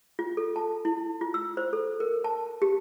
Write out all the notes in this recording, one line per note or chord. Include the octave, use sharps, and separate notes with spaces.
F4
A4
A5
E4
F4
E6
C5
A4
A#4
A5
G4